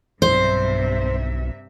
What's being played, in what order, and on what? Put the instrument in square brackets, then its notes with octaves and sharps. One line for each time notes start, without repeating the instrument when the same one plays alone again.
[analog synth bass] B1 [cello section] G2 C3 E5 [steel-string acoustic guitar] C5